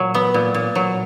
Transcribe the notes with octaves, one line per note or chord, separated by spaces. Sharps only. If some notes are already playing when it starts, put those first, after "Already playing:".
Already playing: A#2 F#3
B3
A#2
A#2
F#3